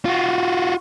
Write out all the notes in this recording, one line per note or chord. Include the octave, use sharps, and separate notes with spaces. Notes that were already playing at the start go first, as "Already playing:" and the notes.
F4 F#4